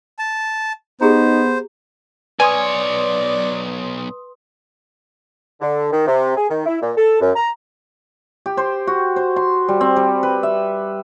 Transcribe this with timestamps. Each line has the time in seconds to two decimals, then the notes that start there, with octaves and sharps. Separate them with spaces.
0.19 A5
1.01 B3 D#4 G4 G#4 C5 A#5
2.40 B1 B4 C#5 D5 G#5 C6 D#6
5.61 D3
5.92 D#3
6.08 C3
6.36 G#4
6.50 D#3
6.66 E4
6.81 A#2
6.97 A4
7.20 F#2
7.36 A#5
8.46 G4
8.57 C5
8.87 F#4
9.16 C5
9.36 C6
9.68 G3
9.81 C4
9.96 G3
10.23 B4
10.43 E5